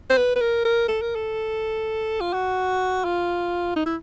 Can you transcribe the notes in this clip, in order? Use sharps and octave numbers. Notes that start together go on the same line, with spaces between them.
C5
B4
B4
A#4
A#4
A4
A#4
A4
F4
F#4
F4
D#4
E4